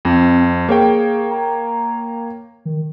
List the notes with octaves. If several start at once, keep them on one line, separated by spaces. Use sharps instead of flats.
F2 C4
A#3 G#4 C#5 G5
A#5
D#3